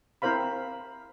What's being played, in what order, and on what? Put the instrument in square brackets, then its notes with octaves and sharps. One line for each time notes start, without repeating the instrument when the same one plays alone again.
[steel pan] C4 E4 A#4 C5 F5 B5